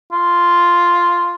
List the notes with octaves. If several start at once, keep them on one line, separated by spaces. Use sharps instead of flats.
F4